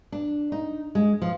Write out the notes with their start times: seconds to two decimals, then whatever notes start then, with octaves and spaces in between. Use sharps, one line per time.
0.12 D4
0.52 D#4
0.95 G#3
1.22 F3